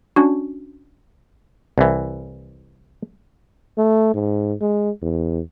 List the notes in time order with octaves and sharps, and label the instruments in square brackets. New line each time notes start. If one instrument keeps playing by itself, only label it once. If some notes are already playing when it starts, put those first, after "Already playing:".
[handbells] C#4 D4 F#4
[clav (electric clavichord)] C2 E3
[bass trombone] A3
G#2
G#3
E2